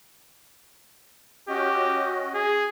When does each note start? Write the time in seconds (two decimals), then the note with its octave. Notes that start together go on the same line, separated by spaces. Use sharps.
1.49 C#4 F#4 G4 D#5
2.34 G#4